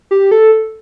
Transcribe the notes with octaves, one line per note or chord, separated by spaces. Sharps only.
G4
A4